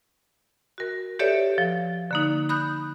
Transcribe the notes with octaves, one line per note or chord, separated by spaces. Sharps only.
F#4 A#4
G4 A4 B4 C#5 D5 E5
F3
D3 A#3 D#4
B5 D#6 F#6 G6